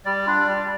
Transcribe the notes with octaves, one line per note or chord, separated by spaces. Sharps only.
G3 D5
D4 F4
G3